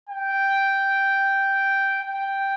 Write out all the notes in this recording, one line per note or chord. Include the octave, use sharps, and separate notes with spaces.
G5
G5